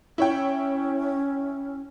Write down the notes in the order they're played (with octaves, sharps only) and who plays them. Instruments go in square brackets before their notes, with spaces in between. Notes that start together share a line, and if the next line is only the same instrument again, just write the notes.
[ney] C#4 [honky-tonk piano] E4 C#5 G5